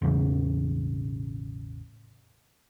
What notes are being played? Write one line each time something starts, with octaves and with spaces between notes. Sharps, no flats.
E1 A1 E2 C#3